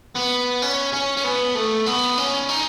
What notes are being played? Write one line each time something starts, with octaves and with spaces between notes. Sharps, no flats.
B3
C#4
C#4
C#4
B3
A3
B3
C#4
D#4